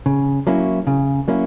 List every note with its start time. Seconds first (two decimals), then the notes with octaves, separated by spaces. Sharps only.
0.06 C#3
0.47 F#3 A#3 C#4 E4
0.87 C#3
1.28 F#3 A#3 C#4 E4